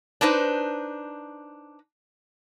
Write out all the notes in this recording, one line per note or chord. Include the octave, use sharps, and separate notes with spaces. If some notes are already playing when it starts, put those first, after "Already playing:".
D4 D#4 B4 C5